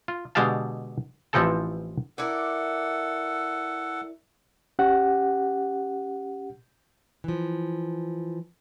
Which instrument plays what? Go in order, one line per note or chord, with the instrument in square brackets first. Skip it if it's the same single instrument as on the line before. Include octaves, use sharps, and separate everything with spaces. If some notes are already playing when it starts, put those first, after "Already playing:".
[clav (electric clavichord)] F4
B2 D3 G#3 G4 F5 A5
A1 E3 F3 C4 A4 A5
[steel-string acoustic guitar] E4 A#4 D5 [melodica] A4 F#5
[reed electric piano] C#4 G4 F#5
[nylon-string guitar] E3 F3